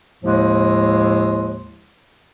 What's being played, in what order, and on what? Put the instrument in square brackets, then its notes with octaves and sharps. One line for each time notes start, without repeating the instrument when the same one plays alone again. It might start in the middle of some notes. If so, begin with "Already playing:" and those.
[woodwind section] D#2 A2 F3 G#3